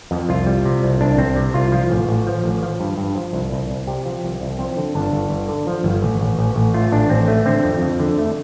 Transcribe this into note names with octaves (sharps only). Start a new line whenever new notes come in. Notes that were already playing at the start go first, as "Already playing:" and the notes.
F2
C2 F4
G3
C3
C2
C2 D4
C2 C4
C3
C2 F4
F3 F4
A1
A1
F3
A1
F3
G2
G2
F3
C2
C2
C2
C3 G4
F3
C2
C2
F3 C4
D3
G1 D4
G1
G1
D3
F3
G1
A1
A1
A1
A1
A3 F4
A1 D4
A1 C4
A3
D3 C4
F2
F2
D3
A3